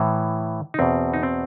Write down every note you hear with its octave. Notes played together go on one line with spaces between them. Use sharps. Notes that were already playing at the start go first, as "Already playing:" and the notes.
Already playing: A2 E3
D#4
E2 B2 C4
D#4
C4